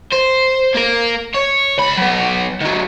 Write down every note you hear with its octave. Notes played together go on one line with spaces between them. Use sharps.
C5
A#3 A#4
C#5
C#2 B5
F#3 B3
D#3 F#3